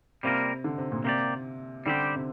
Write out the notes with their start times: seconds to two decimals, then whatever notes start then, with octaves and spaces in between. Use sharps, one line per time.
0.23 C3 G3 A#3 F4 A#4
0.64 D3
0.78 C3
0.92 A#2
1.04 C3 A#3 G4 D5
1.86 D3 G3 C4 G4
2.16 C3